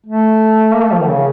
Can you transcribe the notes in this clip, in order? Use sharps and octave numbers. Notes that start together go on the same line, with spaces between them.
A3
A#3
A3
F3
D#3
C#3